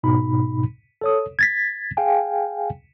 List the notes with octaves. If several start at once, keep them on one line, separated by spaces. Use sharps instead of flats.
G#2 B2 D#4 B5
A4 C#5 D#6
G#6 A6 B6
G#4 F5 G5 G#5